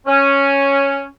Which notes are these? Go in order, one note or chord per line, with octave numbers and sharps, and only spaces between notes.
C#4